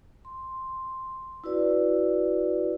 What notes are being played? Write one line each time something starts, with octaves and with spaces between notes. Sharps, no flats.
C6
E4 F#4 B4 D5